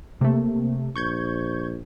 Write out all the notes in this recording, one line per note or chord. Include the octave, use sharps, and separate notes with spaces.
C3 A3 A#3
A#1 C#6 G6 G#6